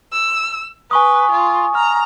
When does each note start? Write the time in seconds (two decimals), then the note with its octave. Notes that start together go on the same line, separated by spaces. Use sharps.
0.12 E6
0.91 B4 G#5 C#6 D#6
1.31 F4
1.75 A#5 F6